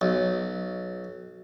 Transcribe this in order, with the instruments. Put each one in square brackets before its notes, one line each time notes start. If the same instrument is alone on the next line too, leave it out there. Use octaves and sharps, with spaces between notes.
[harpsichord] B1